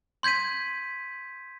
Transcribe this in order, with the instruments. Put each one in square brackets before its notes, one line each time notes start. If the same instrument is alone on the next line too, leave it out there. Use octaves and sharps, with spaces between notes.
[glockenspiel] C6 G6 G#6 B6 D#7